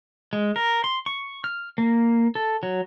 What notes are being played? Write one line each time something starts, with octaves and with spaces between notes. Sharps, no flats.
G#3
A#4
C6
C#6
F6
A#3
A4
F#3